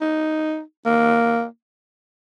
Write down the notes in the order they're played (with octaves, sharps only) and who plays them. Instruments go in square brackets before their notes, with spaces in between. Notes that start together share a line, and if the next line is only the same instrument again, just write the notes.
[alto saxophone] D#4
A#3